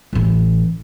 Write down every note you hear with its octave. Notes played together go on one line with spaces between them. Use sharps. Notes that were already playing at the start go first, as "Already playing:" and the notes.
A1 E3